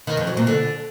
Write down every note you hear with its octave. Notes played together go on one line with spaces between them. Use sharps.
D#3
F2
F#3
A#2
D3